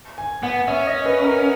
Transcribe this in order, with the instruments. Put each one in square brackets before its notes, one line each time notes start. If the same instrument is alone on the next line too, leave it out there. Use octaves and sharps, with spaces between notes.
[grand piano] G#5
[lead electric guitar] B3 [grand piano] F#5
[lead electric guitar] C#4 [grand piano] E5
[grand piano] D#5
B4
A#4